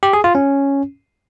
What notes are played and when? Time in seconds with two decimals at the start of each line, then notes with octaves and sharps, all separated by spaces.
0.03 G4
0.13 G#4
0.24 F4
0.35 C#4